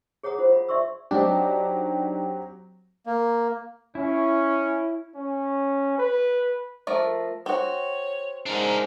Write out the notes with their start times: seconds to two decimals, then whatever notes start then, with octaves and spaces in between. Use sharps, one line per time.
0.23 G#4 C#5 F#5 A#5 D#6
0.38 F4 C5 F#5
0.52 F5 B5
0.69 D5 E5 C6 C#6 E6
1.11 F#3 C4 D4 D#4 G4
3.06 A#3
3.95 C#4 E4
5.15 C#4
5.98 B4
6.87 F3 A3 A#4
7.46 C4 F#4 C#5
8.46 G#2 D4 A#4